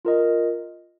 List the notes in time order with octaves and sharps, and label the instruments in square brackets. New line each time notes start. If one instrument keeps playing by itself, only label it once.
[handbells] F4 A#4 D#5